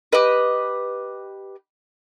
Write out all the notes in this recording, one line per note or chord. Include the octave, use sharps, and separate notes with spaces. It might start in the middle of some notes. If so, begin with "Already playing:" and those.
G4 B4 D#5